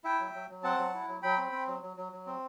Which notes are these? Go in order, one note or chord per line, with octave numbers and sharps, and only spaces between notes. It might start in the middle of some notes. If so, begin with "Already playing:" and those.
E4 E5 G5
F#3
F#3
F#3
C4 F#5 A5
F#3
E4
F#3
F#3 G5 B5
C4
C4
F#3
F#3
F#3
F#3
C4